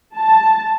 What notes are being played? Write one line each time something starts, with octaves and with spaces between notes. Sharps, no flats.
A5